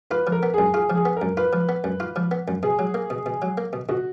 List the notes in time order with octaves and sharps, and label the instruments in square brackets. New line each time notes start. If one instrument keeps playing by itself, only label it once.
[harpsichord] F4 [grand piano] B4
[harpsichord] F3
[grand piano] A#4
[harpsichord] B3
[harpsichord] F#2 [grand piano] G#4
[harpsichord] F4 [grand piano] G#4
[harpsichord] F3
[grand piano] G#4
[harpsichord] B3
[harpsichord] F#2 [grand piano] A#4
[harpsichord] F4 [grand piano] B4
[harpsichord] F3
B3
F#2
F4
F3
B3
F#2
[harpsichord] B2 [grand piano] G#4
[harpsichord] F#3
A#3
B2
B2
F#3
A#3
B2
[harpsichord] B2 [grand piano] F#4